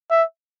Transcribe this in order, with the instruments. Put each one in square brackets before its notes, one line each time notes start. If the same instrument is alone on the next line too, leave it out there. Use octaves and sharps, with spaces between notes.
[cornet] E5